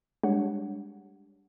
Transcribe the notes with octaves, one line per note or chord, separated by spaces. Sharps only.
G3 G#3 D4 G4 C#5 F#5